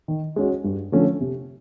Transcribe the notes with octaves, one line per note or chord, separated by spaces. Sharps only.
D#3
G#3 C#4 F#4
G2
D3 F3 A3 C#4
C3